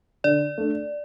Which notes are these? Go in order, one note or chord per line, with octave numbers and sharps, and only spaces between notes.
D3 D5
A3 D4